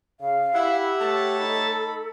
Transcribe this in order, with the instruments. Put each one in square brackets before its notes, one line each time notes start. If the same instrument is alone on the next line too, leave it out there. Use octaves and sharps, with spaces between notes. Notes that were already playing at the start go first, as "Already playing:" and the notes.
[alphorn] C#3 [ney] F5
[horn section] E4 [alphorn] G4 [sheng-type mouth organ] E5 F#5
[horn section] A3 C#5 A5 [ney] A4
[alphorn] D#4 [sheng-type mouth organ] B5